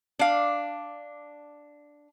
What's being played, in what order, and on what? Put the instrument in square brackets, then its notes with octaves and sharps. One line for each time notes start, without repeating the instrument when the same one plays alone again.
[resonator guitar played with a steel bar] D4 F5